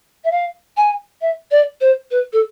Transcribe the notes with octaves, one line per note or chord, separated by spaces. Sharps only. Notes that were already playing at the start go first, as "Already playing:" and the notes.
E5
F5
G#5
E5
D5
C5
B4
A4